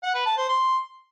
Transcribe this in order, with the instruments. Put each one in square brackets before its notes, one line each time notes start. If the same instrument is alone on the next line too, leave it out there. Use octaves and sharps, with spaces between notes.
[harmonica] F#5
B4
A5
C5
C6